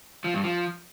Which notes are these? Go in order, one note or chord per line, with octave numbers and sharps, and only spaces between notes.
F3
G2
F3